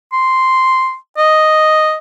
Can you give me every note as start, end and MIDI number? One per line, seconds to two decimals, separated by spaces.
0.13 0.95 84
1.18 1.96 75